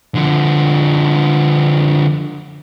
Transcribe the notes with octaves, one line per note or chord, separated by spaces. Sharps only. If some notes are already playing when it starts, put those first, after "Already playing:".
D3 F3